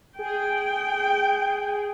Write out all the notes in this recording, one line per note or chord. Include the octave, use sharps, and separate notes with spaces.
G#4 G5